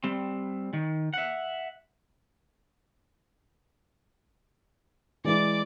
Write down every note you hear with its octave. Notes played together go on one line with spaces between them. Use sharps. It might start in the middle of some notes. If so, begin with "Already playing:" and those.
G3 C4
D#3
E5 F#5
E3 G#3 E4 D5 D6